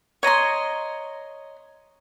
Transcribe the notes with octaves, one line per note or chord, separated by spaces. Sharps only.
C#5 D#5 A#5 C6